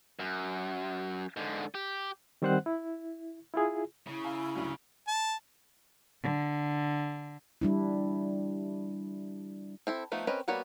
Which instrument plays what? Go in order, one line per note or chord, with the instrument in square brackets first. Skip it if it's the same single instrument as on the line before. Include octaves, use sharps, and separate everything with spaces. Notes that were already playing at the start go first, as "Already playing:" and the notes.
[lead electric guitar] F#2
G#2 D3
G4
[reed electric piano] D#3 G3 C4 C5 F#5 F#6
E4
E4 F4 G#4
[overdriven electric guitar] C#3 [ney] E4
[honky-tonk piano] F5 G#5 A#5
D2 G2 F#3
[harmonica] A5
[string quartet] D3
[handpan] G3 D4 E4
[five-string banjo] C4 E4 A4
F3 A3 B3 D#4
C4 C#4 A#4 B4 D#5
G3 A#3 B3 F#4 C#5